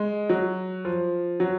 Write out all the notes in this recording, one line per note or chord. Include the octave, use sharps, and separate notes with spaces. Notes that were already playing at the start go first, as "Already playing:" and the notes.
Already playing: G#3
F#3
F3
F#3